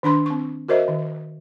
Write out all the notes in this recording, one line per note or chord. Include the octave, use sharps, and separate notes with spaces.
D#3 D4 B5 C6
C4 C#6
F#4 A#4 C5 D#5 E5
D#3